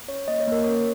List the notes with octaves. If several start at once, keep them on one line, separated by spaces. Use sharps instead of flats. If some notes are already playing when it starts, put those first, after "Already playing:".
C#4 C#5
A#3 D#5
C#5
A#3 A#4
C#4 C#5